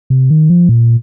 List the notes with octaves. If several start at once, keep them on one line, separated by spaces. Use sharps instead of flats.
C3
D#3
F3
A#2